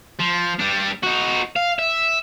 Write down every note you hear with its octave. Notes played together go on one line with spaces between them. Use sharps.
F3
G3 D4
D#4 F#4
F5
E5